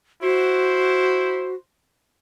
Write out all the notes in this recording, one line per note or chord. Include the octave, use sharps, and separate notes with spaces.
E4 F#4 C5